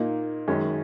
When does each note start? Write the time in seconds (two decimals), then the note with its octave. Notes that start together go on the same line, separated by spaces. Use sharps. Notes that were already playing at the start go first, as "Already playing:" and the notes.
Already playing: A#2 A#3 D#4
0.48 F#2 D#3 G#3 C#4